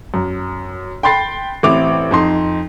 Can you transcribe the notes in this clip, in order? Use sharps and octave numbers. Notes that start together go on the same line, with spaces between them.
F#2
G5 B5 C6 A6 C7
A1 C4 E4 D6 F7
F2 D#4 C6